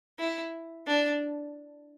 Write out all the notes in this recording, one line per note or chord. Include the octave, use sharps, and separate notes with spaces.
E4
D4